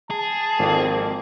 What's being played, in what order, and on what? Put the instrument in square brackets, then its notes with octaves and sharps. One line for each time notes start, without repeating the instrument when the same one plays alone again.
[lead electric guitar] G#4 [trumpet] A5
[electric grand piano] G#1 [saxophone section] F2 A#3